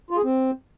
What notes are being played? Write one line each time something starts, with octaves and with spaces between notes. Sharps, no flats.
F4
G#4
C4